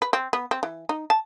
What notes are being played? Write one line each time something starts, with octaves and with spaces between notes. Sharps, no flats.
B4
C4
B3
C4
E3
D#4
A5